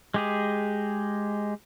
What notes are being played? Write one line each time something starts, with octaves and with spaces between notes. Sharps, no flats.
G#3 G4 G#4